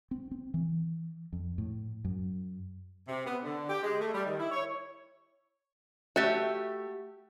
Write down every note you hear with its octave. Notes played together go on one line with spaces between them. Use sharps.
C4
C4
E3
F2
A2
F#2
C3
B3
D3
G4
G#3
A3
G3
D#3
E4
C#5
A3 F#4 G4 E5